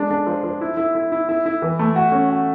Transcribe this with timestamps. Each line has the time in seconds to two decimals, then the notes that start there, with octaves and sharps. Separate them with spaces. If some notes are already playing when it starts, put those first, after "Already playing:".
Already playing: G#3 D4
0.11 D4
0.27 F3
0.44 F3
0.61 E4
0.77 E4
0.95 E4
1.12 E4
1.29 E4
1.46 E4
1.62 E3
1.79 A3
1.96 F#4
2.12 C#4
2.30 F#4